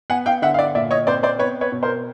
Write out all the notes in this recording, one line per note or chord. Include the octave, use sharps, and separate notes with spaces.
B3 F#5 G#5
F5 G5
D3 E5 F#5
F5
D5 E5
A#2 D5 E5
C#5 D#5
C4 C5 D5
C5 D5
B3 B4 C#5
B4 C#5
B2
A#4 C5